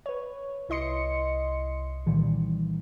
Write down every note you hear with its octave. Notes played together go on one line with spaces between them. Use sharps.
B4 C#5
C2 E4 D#5 C6 C#7
A#2 D#3 E3 G3